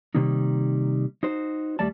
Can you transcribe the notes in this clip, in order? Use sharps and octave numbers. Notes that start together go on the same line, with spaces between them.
C3 D#3 G3 A#3 D#4
D#4 F#4 C5
D#2 G3 A3 D5 A5